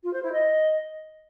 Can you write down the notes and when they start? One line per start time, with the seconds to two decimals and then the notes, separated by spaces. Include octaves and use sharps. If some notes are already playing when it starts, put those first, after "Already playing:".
0.03 F4
0.13 C5
0.23 E4
0.32 D#5